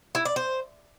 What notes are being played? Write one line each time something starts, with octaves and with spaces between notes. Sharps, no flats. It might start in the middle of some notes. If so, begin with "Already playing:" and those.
E4
D5
C5